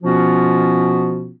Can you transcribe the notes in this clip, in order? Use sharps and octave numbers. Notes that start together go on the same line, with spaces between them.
B2 F3 B3 C#4 F4 F#4